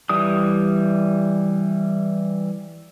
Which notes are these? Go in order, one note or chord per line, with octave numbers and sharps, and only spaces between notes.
E3 G3 D#6